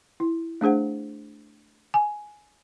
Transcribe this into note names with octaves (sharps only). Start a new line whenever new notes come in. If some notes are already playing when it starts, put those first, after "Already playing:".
E4
A3 D4 G#4 C5 F#5
G#5